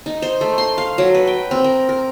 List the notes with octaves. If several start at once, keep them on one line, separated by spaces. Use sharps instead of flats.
D#4
C5
A3
C6
F5
F#3
B4
G5
C4
A#4
A#4